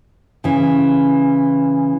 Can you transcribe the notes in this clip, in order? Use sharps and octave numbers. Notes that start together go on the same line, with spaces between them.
C#3 E3